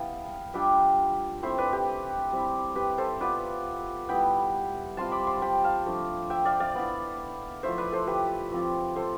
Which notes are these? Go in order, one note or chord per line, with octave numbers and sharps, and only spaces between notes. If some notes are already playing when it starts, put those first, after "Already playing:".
Already playing: G3 B3 E4 F5 G5 A5
G3 D4 F4 E5 G5
A3 C4 E4 C5 E5
B4 D5
G4
G3 C4 E4
G4 B4
A4 C5
B3 F4 B4 D5
G3 B3 E4 G5 B5
G3 C4 F4 A5 C6
B5 D6
A5 C6
G5 A5 B5
F5 A5
F3 A3 D4
E5 G5
D5 F5
D5 F5
B3 E4
F3 A3 E4 C5 E5
B4 D5
A4 C5
G4 B4
F3 C4 F4
A4 C5